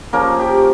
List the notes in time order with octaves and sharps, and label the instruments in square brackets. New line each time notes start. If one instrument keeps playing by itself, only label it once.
[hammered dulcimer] C#3 F3 A#3 C#4 A#4
G4